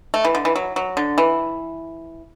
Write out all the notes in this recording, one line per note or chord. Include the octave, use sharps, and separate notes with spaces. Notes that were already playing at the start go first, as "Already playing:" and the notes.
A3
E3
D3
E3
F#3
F#3
D3
E3